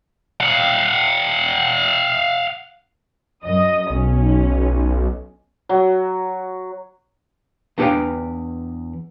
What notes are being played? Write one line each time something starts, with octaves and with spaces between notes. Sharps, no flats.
F5 F#5
F#2 D#5 D#6
B1 C#4
F#3
E2 D4 G4 B4 F5 G5